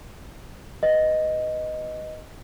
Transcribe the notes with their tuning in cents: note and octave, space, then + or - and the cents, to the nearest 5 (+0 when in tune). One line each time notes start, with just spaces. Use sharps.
B4 +0 D#5 +0